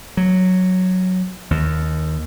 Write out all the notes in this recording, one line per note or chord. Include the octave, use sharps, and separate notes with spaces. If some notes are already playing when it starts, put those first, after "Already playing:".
F#3
D#2